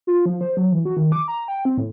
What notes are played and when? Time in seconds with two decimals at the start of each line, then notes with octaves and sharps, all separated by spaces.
0.07 F4
0.26 F3
0.41 C5
0.57 F#3
0.72 E3
0.85 F#4
0.97 D#3
1.12 D6
1.28 A#5
1.48 G5
1.65 C4
1.78 A2